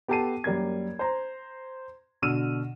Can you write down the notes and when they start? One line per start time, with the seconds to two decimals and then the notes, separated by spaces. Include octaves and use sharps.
0.08 B3 G4 A4 A5 C7 D#7
0.44 F#2 G3 A#3 G#6
0.99 C5 A#5
2.22 B2 D3 E6 F6 D#7 E7